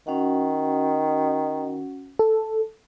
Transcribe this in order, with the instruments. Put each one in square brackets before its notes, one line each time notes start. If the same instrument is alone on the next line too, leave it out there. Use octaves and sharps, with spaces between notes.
[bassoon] D#3 [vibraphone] C#4 F#4 F#5
[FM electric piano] A4